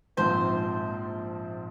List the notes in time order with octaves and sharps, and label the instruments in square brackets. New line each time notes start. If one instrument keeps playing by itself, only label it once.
[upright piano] A#1 G#2 F3 C4 F4 [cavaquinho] C5